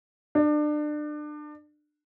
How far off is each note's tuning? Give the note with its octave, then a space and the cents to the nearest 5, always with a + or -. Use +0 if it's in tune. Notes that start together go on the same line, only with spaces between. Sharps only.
D4 +30